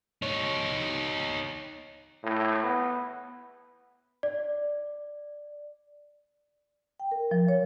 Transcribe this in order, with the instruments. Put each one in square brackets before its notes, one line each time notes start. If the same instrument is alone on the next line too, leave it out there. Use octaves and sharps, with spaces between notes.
[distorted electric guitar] D#4 C#5
[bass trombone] A2
B3
[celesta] D5
[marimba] G5
A#4
F3
C#5